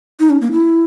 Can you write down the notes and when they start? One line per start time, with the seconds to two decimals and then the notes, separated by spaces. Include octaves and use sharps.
0.20 D#4
0.30 C#4
0.41 A#3
0.52 E4